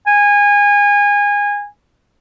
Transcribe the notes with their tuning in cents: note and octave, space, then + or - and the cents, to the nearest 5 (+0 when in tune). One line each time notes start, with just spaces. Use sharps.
G#5 -25